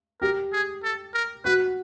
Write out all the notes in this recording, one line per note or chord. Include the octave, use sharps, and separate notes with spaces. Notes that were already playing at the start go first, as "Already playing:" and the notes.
G4 A#4
G#4
A4
A#4
F#4 B4